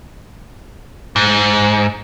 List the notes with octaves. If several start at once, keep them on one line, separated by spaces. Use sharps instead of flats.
G#2